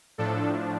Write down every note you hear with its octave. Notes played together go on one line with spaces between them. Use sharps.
A2 F3 D4 A4